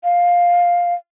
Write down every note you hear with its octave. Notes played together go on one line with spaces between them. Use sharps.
F5